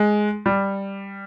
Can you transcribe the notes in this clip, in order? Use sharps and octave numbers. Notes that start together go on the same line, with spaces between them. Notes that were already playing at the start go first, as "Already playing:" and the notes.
Already playing: G#3
G3